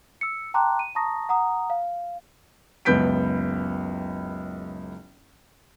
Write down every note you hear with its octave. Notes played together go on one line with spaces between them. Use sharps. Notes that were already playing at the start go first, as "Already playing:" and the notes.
E6 C#7
G5 A5 A#5 C6 D6 F#6
D#7
A5 A#5 C#6 D#6 A#6
F#5 A#5 D#6
F5
F#1 C#2 B3 G6 B6 D7